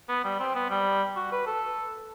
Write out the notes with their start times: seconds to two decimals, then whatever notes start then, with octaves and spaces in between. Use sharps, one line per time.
0.09 B3
0.25 G3
0.40 C4
0.55 B3
0.70 G3
1.16 F#4
1.32 B4
1.46 A4